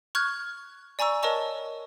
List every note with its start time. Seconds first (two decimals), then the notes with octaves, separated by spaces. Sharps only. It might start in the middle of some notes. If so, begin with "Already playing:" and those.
0.15 C#6 F6 F#6 G#6
0.99 D5 G#5 A#5 C#6 E6
1.23 A#4 C#5 D#5 A5 C#6